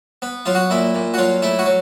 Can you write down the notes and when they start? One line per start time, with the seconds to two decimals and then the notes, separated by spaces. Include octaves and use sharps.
0.22 B3
0.46 F#3 F4
0.55 F#4
0.70 A#2 E4
0.95 A#2
1.14 F#4
1.18 F#3 F4
1.42 A3 E4
1.59 F#4
1.66 F#3